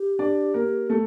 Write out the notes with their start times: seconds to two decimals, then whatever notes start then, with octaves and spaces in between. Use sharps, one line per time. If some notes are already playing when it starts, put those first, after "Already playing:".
Already playing: G4
0.19 D4 D5
0.54 A#3 A#4
0.90 A3 A4